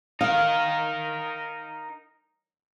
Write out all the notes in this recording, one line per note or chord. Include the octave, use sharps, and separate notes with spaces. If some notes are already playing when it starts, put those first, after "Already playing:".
D#4 A#4 F5